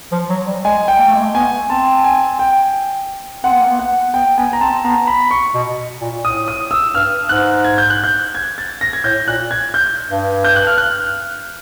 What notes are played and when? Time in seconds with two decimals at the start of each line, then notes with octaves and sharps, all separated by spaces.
0.12 F3
0.29 F#3
0.47 G3
0.64 G#3 G#5
0.88 G5
0.99 A#3
1.07 A3
1.15 G#3
1.23 A3
1.34 B3 G#5
1.69 C4 A5
2.04 G#5
2.39 G5
3.44 C4 F#5
3.52 B3
3.60 A#3
3.68 B3
3.79 F#5
4.14 B3 G5
4.38 B3 G#5
4.53 A#5
4.61 C4 A5
4.84 B3 A#5
5.07 B5
5.31 C#6
5.55 B2
6.01 A#2
6.24 A2 D#6
6.48 D#6
6.71 E6
6.94 G2 F6
7.29 G#2 F#6
7.64 G#6
7.78 G6
7.90 F#6
8.04 G6
8.35 G#6
8.58 A6
8.81 A#6
8.93 G#6
9.04 A2 G6
9.28 A#2 F#6
9.51 G#6
9.74 G6
10.09 G2
10.44 G6
10.56 F#6
10.67 F6
10.77 F#6